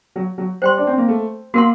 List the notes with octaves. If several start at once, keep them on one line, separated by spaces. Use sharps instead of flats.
F#3
F#3
G3 C5 G5 C6
D4
C4
A#3
A3
A#3 F#4 A#4 F#5 C6